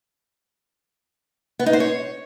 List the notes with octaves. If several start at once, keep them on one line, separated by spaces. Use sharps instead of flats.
B3
D#4
C5
C#5